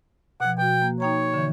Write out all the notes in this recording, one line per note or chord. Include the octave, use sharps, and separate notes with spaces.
B2 F3 F#5
B2 F#4 G5
A#3
D#4 C#5 G5 A#5
D3 E3